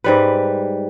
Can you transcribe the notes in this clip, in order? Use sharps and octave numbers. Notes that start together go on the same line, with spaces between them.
G#2 G3 B4